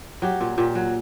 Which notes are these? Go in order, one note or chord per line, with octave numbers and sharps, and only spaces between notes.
F#3 G4
A#2
A#2 G4
F#3